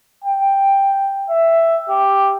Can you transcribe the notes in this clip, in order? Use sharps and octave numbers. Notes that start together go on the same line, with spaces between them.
G5
E5
G4